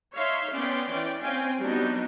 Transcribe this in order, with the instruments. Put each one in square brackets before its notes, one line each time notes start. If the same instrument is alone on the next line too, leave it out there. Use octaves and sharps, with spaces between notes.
[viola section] D#4 C#5 E5 F5 C6
B3 C#4 D5 G5 C6
E3 C#4 D5 G5
C4 C#4 F5 G5 G#5
F#3 G3 B3 D4 D#4